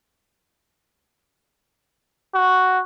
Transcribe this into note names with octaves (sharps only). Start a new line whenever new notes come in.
F#4